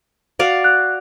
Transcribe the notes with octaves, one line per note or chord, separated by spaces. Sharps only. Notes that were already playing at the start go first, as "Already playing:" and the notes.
F#4 D5 F5
F#6